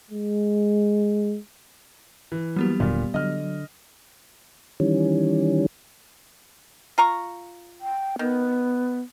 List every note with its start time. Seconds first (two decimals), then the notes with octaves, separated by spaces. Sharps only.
0.11 G#3
2.32 E3
2.56 F#3 G3 A#3 B3 G4
2.80 D#1 D#2 A#2 D3
3.14 D3 F#3 D#5 F6
4.80 D#3 E3 G3 C#4
6.98 F4 A#5 C#6
7.81 G5
8.19 D#3 B3